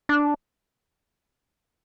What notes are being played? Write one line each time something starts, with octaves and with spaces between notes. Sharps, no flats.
D4